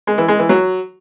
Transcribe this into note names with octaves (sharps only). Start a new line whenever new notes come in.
G#3
E3
G#3
E3
F#3